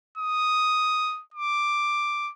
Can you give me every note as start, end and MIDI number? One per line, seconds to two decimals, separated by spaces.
0.18 1.22 87
1.34 2.32 86